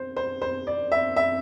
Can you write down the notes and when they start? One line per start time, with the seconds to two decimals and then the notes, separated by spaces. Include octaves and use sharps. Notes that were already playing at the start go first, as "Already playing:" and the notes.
Already playing: C5
0.17 C5
0.42 C5
0.67 D5
0.92 E5
1.16 E5